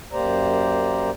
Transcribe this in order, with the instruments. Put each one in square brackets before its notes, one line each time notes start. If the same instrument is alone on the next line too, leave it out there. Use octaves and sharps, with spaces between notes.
[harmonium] F#2 A#3 G4 C5 D5 A#5